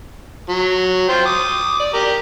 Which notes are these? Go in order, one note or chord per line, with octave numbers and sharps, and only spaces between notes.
F#3
F4 C5 G5
D6 D#6
D5
G4 A#4